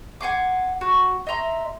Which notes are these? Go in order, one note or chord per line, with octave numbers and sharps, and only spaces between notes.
F#5 G#5 C6 D6
F#4
D#5 E5 A#5 C6